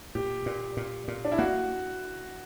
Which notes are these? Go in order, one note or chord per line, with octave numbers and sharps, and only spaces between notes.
A#2 G4
A#2
A#2
A#2
D4
E4
A#3 F#4